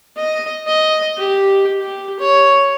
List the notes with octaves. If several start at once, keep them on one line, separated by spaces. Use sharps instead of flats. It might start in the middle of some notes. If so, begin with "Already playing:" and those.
D#5
D#5
G4
G4
C#5